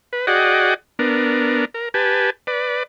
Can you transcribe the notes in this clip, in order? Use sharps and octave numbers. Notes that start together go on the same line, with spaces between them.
B4
F#4 G#4 D5 D#5 F#5 G5
B3 D4 A#4
A#4
G4 B4 G#5 A5
B4 D5